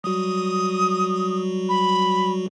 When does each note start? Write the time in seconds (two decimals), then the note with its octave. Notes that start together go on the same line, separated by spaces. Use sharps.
0.04 F#3 G3 F#4 D#6
1.69 B5